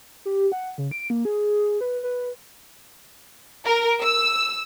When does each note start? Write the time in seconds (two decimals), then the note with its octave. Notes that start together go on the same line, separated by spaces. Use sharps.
0.25 G4
0.52 F#5
0.78 C#3
0.91 D7
1.10 A#3
1.25 G#4
1.81 B4
2.03 B4
3.66 A#4
4.01 E6